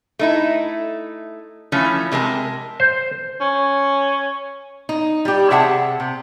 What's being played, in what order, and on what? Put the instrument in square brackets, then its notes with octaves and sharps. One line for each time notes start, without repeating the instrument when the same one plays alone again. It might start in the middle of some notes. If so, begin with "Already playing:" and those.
[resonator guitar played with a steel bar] A3 D#4 E4
E3 F3 A3 C#4
C3 G#3 A#4 A5
[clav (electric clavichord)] C5
[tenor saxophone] C#4
[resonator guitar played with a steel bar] D#4
G3 G4
C3 G#4 E5 F#5 A5
C3